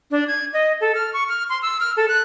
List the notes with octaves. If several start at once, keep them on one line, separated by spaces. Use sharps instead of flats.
D4
G#6
D#5
A4
F6
C#6
F6
C6
E6
F6
A4
F#6